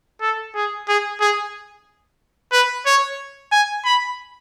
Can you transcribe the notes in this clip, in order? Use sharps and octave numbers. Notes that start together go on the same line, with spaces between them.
A4
G#4
G#4
G#4
B4
C#5
G#5
B5